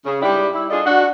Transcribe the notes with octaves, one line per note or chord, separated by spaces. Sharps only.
C#3
G#2 G3 D4 E4 G4
E4
D4 F4 G#4 A4 D5 D#5
D4 F#4